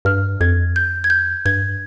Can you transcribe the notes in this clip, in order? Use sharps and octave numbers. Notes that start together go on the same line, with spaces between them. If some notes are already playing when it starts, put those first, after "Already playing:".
G2 F6
F2 G#6
G6
G#6
G6
G2 G#6